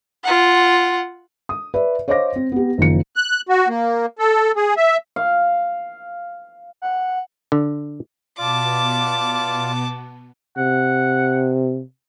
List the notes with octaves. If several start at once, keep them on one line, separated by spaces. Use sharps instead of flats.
F4 F#5
D#6
B4 D5 E5
C5 C#5 D#5 F5 D6 A#6
C4
B3 G4
F#1 D#3 F3 C#7
F#6
F#4
A#3
A4
G#4
E5
F5
F#5
D3
B2 B3 F4 D5 A5 D6
C3 F#5